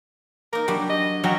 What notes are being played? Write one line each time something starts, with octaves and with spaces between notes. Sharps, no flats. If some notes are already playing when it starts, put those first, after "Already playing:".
A#3 D#4 A#4
F#3 G3 D4 G4
D#5
F#3 C#4 F#4 E5 F5 G5 A#5